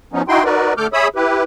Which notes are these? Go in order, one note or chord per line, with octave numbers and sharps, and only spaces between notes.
F3 B3 C#4 D#4
D#4 E4 F#4 G5 C6
D#4 F#4 A#4 B4 D5
D3 A3 A4 D6 F6 G6
G#4 C#5 E5 B5 D#6 E6
E4 G4 B4